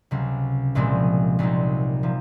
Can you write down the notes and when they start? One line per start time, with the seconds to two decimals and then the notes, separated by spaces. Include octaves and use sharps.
0.11 C#2 C3 F#3
0.75 C2 A#2 F3 G#3 C4
1.39 C2 A#2 F#3 C4 D#4
2.03 C3 F3 A#3